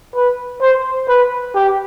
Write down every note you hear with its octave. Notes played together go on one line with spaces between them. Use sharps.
B4
C5
B4
G4